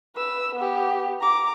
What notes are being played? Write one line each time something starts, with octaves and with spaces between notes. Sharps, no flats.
B4 E6
B3 G4
A#5 D6